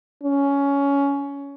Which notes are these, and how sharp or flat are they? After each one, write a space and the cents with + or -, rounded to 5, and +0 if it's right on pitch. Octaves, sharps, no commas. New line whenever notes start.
C#4 +15